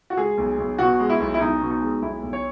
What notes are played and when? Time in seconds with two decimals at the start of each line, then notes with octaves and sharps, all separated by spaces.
0.10 F#4
0.17 G#3 G#4
0.38 B1
0.58 B1
0.78 B2 F#4
1.00 G#3
1.10 E4
1.20 B1
1.34 E4
1.40 B1 D#4
1.61 B2
1.71 D#4
1.81 G#3
2.02 B1 E4
2.23 B1
2.33 C#5